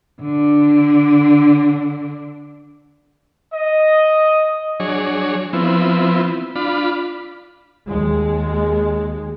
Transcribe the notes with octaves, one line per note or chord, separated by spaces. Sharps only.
D3 D4
D#5
F#3 D4 G#4 C#5
F3 B3 C4 E4
D4 F4 B5
D#2 G#3